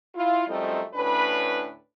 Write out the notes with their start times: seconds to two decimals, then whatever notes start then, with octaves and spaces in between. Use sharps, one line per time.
0.15 E4 F4
0.48 F#2 F3 G3 A3 C4 D#4
0.94 D2 A2 C#4 D4 B4